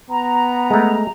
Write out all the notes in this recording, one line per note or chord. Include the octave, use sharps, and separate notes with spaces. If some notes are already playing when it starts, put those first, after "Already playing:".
B3 A#5
G#3 A3